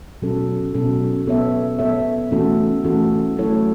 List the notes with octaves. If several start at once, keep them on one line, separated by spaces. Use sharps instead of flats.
B2 F#3 C#4 A4
B2 F#3 C#4 A4
B3 A4 C#5 E5
B3 A4 C#5 E5
E3 A3 C#4 F#4 A4
E3 A3 C#4 F#4 A4
F#3 A3 E4 A4 C#5